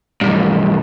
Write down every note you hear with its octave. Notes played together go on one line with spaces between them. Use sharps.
B1 G2